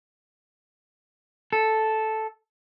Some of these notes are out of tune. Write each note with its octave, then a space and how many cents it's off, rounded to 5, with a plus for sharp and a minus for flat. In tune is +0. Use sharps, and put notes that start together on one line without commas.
A4 -5